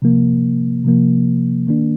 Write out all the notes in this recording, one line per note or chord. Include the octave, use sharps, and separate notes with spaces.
C3 F3 A#3
C3 F3 A#3
D#3 A#3 D4